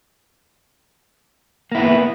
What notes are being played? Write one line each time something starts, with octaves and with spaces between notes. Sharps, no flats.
A#3 B3 E4